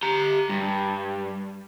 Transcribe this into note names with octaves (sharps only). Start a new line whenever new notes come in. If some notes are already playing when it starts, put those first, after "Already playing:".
G4 A#5
G2